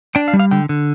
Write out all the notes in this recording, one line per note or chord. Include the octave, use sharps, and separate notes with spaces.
D4 G5
F5
G3
F5
D3 G5
D3